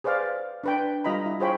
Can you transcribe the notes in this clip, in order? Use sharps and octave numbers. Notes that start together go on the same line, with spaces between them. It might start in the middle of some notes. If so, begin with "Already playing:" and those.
G#4 B4 C5 D5 F5
D4 B4 G5
G3 F4 D#5 A#5 B5
E4
F4 G#4 C5 C#5 G5 B5